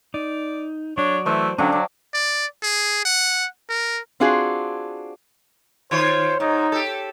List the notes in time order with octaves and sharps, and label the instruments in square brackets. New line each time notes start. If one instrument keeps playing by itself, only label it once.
[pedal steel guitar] D#4 [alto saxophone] D5
[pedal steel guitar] F#3 D5 [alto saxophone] D4 [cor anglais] C#5
[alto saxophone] E3 [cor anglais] A3 [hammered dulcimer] C5
[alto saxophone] D3 [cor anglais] F#3 [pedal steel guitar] C#4 [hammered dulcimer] D4 F5 G5
[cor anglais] F#3 [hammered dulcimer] D4 [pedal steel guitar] D6
[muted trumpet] D5
G#4
F#5
A#4
[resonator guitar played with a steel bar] C4 D4 F4 F#4 G#4
[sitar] D#3 F4 C#5 [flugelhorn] C5
[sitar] G#2 [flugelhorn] D#4
[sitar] G4 A4